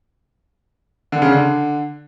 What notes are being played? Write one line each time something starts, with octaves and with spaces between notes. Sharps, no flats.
D3
C#3
D3